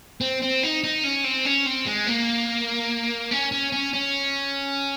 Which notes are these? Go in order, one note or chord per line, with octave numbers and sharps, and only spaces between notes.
C4
C4
D#4
D#4
C#4
C4
C#4
C4
G#3
A#3
C#4
C#4
C#4
C#4